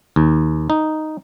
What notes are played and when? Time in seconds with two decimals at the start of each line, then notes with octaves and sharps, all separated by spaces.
0.16 D#2
0.70 D#4